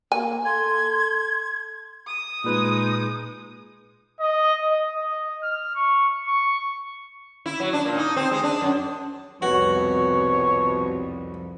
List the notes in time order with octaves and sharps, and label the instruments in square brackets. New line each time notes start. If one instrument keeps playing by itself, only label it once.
[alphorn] A#3 [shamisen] G#5
[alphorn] A4 [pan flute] C6 [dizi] G#6
[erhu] D#6
[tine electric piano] A#2 B4 [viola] G#3 D#4
[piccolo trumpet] D#5
D#5
D#5
F6
C#6
C#6
[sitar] E4
F#3
D4
A#2
D#4
C4
G#3
D4
F#2
[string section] C2 F2 [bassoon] B2 [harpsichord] F#4 [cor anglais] C#5